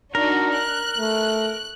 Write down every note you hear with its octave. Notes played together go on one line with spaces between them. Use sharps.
D4 D#4 F#4 A#4
F#6
A3